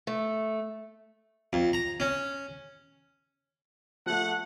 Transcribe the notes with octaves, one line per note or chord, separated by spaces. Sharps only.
A3
F2
A#5
C#4
F3 A3 F#5